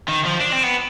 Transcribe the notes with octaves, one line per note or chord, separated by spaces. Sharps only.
D#3
F3
D4
C4
B3